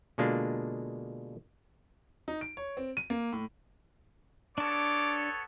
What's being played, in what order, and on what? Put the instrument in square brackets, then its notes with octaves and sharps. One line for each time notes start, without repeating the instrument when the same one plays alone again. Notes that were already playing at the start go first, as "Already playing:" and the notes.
[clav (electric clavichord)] B2 D3 G#3 A#3 D4 F4
[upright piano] D#4
D7
C#5
C4
D#7
A#3
A2
[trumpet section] B3 A4 C#5 [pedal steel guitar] D4 A5 [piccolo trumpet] D6